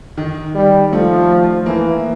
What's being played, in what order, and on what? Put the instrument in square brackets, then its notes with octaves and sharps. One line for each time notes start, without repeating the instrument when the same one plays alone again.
[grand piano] D#3
[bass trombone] G3
[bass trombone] F3 [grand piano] A3
[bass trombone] E3 [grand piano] A#3